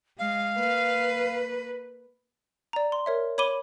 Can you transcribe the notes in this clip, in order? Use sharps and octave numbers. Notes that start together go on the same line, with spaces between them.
G#3 F5
A#3 B4
D5 A#5
C6
A#4 C#5 E5
C#5 B5 D6 D#7 G7